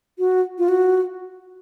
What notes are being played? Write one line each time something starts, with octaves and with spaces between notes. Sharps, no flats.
F#4
F4
F#4